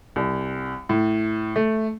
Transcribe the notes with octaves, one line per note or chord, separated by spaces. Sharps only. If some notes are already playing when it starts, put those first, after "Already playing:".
C2
A2
A3